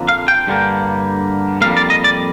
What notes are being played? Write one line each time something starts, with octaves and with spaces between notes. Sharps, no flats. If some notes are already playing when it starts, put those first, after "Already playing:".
Already playing: F2 D3 F3 A#3
F5
G5
G2 D3 G3 A#3
F2 C3 G3 A#3 F5
D5
D#5
D5